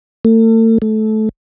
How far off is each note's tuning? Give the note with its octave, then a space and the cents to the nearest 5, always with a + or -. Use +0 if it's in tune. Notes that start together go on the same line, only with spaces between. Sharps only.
A3 +40
A3 -20